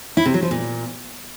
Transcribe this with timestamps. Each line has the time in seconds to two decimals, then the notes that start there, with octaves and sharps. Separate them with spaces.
0.17 E4
0.25 C3
0.34 F#3
0.42 F3
0.51 A#2